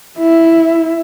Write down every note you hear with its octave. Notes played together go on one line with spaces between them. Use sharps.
E4